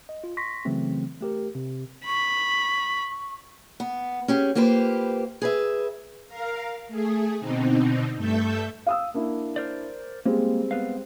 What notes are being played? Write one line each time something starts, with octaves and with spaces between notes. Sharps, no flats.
D#5
F4
C6 C#6 A#6 B6
C#3 E3 F#3 A3 C4
A3 G4 A#4
C3
B5 C#6
B3
C#4 G4 G#4
A#3 F4 G4 B4 C5
G#4 B4 E5
A#4 F5
A3 G#4
B2 D3 C4 D#4
G2 A3 A4 E5 G6
F5 D#6 E6
A#3 D4 E4
A#4 C5 D5
G3 G#3 A#3 C4
B3 B4 F5